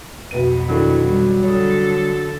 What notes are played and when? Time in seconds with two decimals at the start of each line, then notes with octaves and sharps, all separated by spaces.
0.31 B1 F2 B2 B4 D#7
0.69 D#3 F#3 D4 E4 A4
1.06 G3
1.43 D3 A4 C#5 D#6